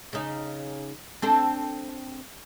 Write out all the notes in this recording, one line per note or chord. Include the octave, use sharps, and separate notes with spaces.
C#3 D#4
C4 D4 A4